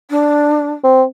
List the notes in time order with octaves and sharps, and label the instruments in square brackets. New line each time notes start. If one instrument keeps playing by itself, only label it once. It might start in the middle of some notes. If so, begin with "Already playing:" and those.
[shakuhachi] D4
[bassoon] C4